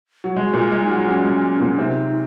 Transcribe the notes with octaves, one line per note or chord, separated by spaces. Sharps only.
F#3
G#3 F#4
A#2 A#3
F4
G#3
D#4
F#3
F#3 C#4
G#3
A#2 A#3
C3 C4 D#4